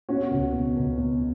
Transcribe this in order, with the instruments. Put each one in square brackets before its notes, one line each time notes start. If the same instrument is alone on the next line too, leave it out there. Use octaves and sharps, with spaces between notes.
[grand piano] B2 C#4 F#4
C#2
B2
C#2
B2